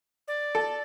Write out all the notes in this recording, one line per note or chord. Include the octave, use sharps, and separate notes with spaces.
D5
A4